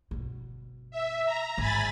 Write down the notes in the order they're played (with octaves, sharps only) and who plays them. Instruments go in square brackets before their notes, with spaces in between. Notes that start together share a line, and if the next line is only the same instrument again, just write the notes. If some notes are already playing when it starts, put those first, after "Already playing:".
[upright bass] G1 B2
[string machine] E5
A#5
[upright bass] G#1 D#3 [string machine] G#5 B5 A6